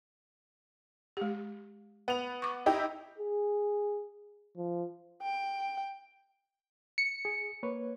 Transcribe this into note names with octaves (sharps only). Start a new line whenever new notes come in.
G#3 G4
B3 F7
C#6 D6
D#4 E4 G4
G#4
F3
G5
C#7
G#4
A#3 B4 C#5